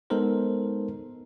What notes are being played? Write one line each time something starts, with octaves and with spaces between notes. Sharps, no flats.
G#3 B3 D#4 A4 A#4 C5